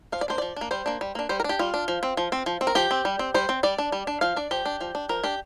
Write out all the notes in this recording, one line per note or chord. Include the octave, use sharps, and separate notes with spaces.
F3 F5
D5
A#3 D4 C5
F3 D5
A#3 D4
G3 C5
A#3 D4
G3
A#3 D4
G3 C5
A#4
D4 G4
G3 F4
D4
F3
C4
F3
C4
F3
C4
A#4
F3 G4
C4
G3
C4
G3 C5
C4
G3 D5
D4
G3
D4
F3 F5
D4 D5
F3 G4
D4
F3
D4
F3 A#4
D4 G4